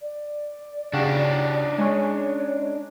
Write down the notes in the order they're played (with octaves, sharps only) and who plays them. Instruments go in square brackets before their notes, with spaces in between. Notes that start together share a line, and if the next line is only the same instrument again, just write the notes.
[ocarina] D5
[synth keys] C#3 F#4 G4 [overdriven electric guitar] D4 D#4
[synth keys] G#3 C#4 [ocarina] C#5